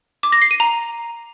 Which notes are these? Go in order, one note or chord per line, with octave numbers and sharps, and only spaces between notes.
D6
A#6
C7
D#7
A#5